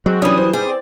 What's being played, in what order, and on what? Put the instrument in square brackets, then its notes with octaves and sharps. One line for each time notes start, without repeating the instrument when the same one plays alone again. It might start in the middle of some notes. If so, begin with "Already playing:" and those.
[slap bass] F#3 [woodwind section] G#3 C4 F#4
[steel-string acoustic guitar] E3 G3 [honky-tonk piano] C#4 D4 [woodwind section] D#6
[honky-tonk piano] C5
[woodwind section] G#2 G3 [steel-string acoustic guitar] G#4
[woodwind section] C4 D5